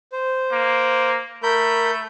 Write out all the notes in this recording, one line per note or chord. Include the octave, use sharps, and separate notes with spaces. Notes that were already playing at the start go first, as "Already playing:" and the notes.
C5
A#3
A3 A#4 B5 G6